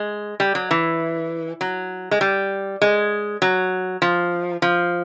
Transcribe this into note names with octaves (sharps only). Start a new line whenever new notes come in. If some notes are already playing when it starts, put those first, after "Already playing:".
Already playing: G#3
G3
F#3
E3
F#3
G#3
G3
G#3
F#3
F3
F3